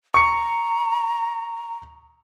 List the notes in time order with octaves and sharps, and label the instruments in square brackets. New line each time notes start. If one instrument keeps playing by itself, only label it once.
[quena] A#5 [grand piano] C#6 C#7